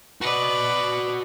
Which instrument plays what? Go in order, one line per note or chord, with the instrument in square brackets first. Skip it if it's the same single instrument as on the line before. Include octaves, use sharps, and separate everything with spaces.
[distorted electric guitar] F#4 D#5 [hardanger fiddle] B4 D5